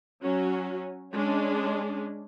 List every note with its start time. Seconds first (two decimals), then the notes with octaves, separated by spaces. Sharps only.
0.22 F#3 C#4 F#4
1.12 G#3 C#4 D4